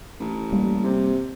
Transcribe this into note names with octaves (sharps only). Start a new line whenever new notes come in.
A1
G3 A#3
C3